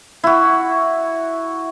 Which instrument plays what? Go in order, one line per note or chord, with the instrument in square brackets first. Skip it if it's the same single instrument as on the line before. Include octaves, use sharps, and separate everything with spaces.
[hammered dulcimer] E4 F#4